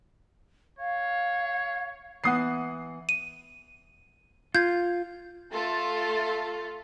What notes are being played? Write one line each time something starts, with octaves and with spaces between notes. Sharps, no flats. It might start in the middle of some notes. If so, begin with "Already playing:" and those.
C#5 F5
E3 B3 F#5 D#6 C7
D#7
F4 G6 G#6
A3 F4 A4